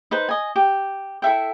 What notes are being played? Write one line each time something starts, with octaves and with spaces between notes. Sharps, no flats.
D#4 B4 C5
D#5 G#5
G4
E4 A4 E5 G5